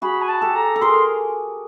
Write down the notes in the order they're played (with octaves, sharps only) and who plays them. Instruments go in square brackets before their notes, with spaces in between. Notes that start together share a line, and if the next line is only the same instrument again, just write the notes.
[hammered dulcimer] F#4 G#4 [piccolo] B5
[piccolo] G#5
A5
[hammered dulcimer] G4 A4
[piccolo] A#5
[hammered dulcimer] A4
[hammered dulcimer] G#4 A#4 [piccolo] C6